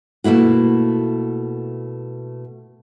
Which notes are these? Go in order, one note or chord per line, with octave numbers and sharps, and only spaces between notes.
B2 A3 A#3 E4 F#4